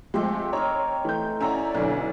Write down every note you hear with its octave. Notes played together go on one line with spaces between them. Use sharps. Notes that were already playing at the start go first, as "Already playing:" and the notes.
F3 G#3 A3 C4 G4 C6
D#4 A#4 C#5
E3 A3 G6
C#4 E4 C#5 D5 E5 F#5 A#5
B1 B2 D3 C#4